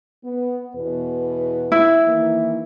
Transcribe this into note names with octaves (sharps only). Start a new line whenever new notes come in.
B3
E2 B2 B4
E4
D#3 E3 A#3